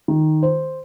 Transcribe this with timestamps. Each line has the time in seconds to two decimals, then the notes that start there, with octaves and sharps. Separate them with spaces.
0.08 D#3
0.43 C5